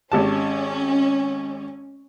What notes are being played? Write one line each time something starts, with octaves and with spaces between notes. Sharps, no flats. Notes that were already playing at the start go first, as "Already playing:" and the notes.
G#1 C#4 G4 A5